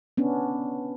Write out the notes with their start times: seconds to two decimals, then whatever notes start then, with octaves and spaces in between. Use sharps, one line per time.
0.17 B3 C#4 D4